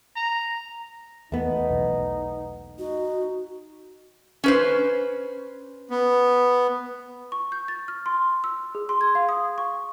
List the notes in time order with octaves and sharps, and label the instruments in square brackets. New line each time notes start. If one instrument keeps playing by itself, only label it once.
[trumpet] A#5
[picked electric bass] E2 [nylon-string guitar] A3 B3 [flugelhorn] D#4
[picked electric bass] B1 E2
[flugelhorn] D#4 [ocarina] F#4
[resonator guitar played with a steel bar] C#4 B4 C5
[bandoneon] B3
[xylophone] C#6
G6
A6
F6
C6
E6
G#4
C6
G#6
F5
D#6
C#6